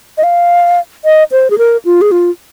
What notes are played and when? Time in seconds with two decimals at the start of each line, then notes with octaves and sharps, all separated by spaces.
0.18 D#5
0.23 F5
1.05 D#5
1.32 C5
1.50 G#4
1.58 A#4
1.85 F4
2.02 G#4
2.12 F4